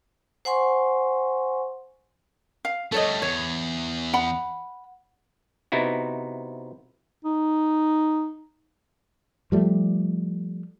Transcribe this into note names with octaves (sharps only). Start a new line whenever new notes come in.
C5 F#5 G#5 C6 C#6
F5
G3 A3 A4 C#5 D#5
E2 C#5
F#5 B5
C3 B3 D#4 E4 F#4
D#4
F3 G3 A3